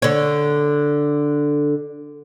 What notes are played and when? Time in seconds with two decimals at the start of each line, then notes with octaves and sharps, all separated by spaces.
0.02 D3 C#5